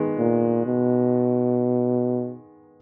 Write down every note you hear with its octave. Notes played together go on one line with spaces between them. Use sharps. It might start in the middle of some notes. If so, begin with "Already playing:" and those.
Already playing: D#3 G#3 B3
A#2
B2